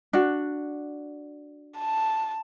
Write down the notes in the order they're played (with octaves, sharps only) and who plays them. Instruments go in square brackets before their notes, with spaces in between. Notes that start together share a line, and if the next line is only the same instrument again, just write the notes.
[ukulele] D4 F#4
[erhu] A5